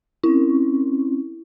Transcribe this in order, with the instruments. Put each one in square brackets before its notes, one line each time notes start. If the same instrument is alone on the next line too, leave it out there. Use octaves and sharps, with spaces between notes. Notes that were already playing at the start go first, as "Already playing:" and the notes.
[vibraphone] C4 C#4 [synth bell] E4